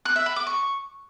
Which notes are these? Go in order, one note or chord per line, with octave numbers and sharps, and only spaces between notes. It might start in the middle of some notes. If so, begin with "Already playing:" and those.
F#6
E5
B5
D6
C#6